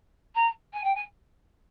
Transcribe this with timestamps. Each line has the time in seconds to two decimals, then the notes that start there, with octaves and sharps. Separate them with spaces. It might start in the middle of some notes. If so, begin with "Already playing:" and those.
0.35 A#5
0.73 G#5
0.84 G5
0.95 G#5